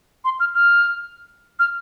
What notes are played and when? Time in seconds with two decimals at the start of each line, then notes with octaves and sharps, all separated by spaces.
0.25 C6
0.40 F6
0.55 F6
1.59 F6